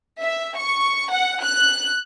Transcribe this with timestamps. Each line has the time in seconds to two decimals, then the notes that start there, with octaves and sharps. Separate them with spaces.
0.21 E5
0.56 C#6
1.11 F#5
1.42 F#6